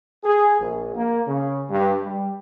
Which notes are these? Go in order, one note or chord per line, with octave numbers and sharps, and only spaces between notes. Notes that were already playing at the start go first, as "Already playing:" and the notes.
G#4
A#1
A#3
C#3
G2
G3